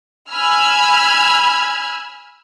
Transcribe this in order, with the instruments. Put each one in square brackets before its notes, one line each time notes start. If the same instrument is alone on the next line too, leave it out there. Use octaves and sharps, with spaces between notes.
[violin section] G#5 B5 E6 F6 G#6